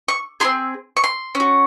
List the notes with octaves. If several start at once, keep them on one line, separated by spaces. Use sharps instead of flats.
C#6
C4 F4 G#4 C6
C#6
C6
C#4
F#4